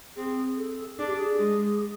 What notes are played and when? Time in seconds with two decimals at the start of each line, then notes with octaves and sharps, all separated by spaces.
0.16 C4 G#4
0.57 A4
0.99 D4 G#4
1.07 G4
1.16 G#4
1.39 G#3